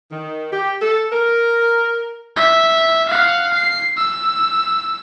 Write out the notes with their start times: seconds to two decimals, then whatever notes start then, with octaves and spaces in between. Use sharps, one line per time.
0.12 D#3
0.52 G4
0.82 A4
1.12 A#4
2.36 E5
3.09 F5 F#5
3.53 C7
3.98 E6